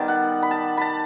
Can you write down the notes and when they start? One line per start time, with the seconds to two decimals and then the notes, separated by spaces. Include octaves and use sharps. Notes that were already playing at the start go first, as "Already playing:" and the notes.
Already playing: D#3 G3 B3 A5
0.08 F#5
0.43 B5
0.51 A5
0.77 A5 B5